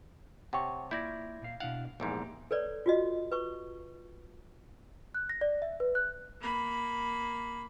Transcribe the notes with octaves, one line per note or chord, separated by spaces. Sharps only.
C3 C#5 F#5 G5 A5 C#6
A#3 E4 F4 A#4 D5 G6 G#6 A#6
A#2 F5
B2 D4 E4 F5 F#5
A#1 E2 G#2 A#3 D#4 G4
A4 B4 C#5 D5
F4 F#4 D#5
B4 C#6
F#6
A#6
D5
E5
B4
F#6
A#3 B5